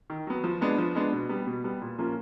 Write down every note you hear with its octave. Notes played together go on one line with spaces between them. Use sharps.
D#3
F#3 B3
F3
G#3 B3 D4
F3
G#3 B3 D4
B2
G3 B3
B2
G3 B3
A#2
F3 A#3 C#4 F4